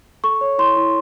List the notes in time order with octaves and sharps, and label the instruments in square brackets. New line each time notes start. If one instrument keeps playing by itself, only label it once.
[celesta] A4 C#6
C#5
E4 C6
E4